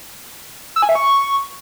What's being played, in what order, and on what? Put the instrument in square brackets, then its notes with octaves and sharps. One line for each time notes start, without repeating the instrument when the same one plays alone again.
[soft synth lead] E6
G#5
E5
C#6